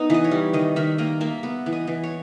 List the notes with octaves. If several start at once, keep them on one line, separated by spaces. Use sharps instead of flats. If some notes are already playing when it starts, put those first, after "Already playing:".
Already playing: B3 D#4
E3 D#5
C#5
G3
D#3 D#5
D#3 E5
A#3 D#5
A#3 E5
B3
E3
D#5
E3
C#5